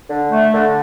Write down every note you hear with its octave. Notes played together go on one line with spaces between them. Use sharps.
D3
A3
D3